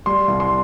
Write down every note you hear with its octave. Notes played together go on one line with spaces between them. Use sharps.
G3 C6
C2
C6